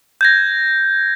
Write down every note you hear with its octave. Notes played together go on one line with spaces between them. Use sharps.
G6 G#6 A#6